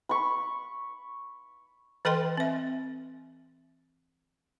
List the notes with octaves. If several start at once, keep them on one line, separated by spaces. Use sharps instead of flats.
B5 C#6
E3 A4 B4 D#5 G5 C6
C4 E5